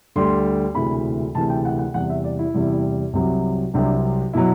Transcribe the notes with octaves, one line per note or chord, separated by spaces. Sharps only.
D2 D3 G3 C6
E1 D2 C3 E3 B5
E1 D2 C3 E3 A5
G5
F#5
F#5
E2 C3 G3 F#5
E5
D5
E4
E2 C3 G3
C2 C3 F#3
C2 C3 F#3 D4
B2 F#3 E4